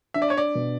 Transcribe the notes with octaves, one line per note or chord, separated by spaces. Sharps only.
D4 E5
D5
C#5
D5
B2